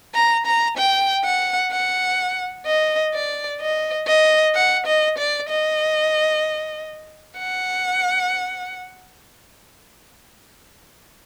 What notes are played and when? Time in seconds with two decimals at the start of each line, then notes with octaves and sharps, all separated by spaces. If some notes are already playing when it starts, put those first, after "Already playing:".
0.15 A#5
0.46 A#5
0.77 G5
1.24 F#5
1.72 F#5
2.66 D#5
3.14 D5
3.60 D#5
4.07 D#5
4.55 F#5
4.86 D#5
5.18 D5
5.49 D#5
7.38 F#5